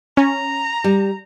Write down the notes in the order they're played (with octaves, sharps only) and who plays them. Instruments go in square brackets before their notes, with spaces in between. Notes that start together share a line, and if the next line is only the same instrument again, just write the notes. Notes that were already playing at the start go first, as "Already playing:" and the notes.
[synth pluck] C#4 [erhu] A#5
[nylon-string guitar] G3